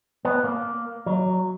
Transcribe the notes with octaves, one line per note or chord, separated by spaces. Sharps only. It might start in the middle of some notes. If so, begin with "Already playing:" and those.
B3
A#3
F#3